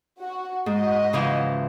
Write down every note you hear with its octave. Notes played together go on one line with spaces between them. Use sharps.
F#4
G#2 F#4 D#5
C#3 E3 F3